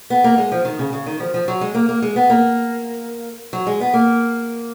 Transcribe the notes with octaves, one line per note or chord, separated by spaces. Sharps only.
B3
A#3
G#3
F3
D#3
C#3
C#3
D#3
F3
F3
F#3
G#3
A#3
A#3
G#3
B3
A#3
F#3
G#3
B3
A#3